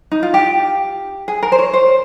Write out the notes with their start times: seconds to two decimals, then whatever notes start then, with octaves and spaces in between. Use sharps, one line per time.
0.11 D#4
0.23 F4
0.34 G4
1.28 G#4
1.43 A#4
1.52 C5
1.59 C#5
1.73 C5